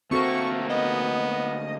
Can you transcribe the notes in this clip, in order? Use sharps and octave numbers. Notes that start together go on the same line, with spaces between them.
D2 A3 A#3 C4 F#4 A4 C#6
B3 D#5